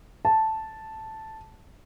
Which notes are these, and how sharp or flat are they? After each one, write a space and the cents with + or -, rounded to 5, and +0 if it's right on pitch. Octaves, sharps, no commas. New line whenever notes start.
A5 +0